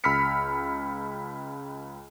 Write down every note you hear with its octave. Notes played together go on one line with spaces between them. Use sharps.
C#2 B5 E6 F6 B6 C#7